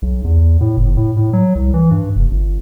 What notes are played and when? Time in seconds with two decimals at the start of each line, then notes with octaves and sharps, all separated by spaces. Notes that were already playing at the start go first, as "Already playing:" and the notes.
0.02 B1
0.24 E2
0.61 A2
0.77 F#1
0.97 A2
1.17 A2
1.33 F#3
1.55 C2
1.74 E3
1.91 G2
2.16 F1
2.31 G1